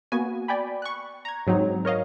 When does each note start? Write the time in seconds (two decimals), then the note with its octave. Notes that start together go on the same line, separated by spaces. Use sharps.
0.12 A#3 B3 F#4 G#5
0.48 D5 G5 G#5 B5
0.82 C#6 F#6
1.25 A#5 G#6
1.47 G#2 F#3 C4 D#4
1.85 A#4 C#5 D#5 F5